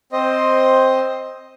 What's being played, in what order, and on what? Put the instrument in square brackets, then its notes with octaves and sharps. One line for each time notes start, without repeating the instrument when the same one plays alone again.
[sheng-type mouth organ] C4 C5 D#5